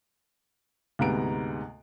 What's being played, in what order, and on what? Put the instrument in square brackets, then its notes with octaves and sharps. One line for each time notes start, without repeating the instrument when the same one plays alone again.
[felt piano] D2 G#2 C3 B3 A#5 D7